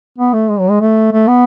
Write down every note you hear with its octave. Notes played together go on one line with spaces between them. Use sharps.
B3
A3
G#3
F#3
G#3
A3
A3
B3